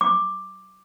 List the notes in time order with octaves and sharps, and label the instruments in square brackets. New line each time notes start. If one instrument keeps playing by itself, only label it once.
[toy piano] D6